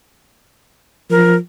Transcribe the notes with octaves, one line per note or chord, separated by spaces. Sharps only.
F3 A#4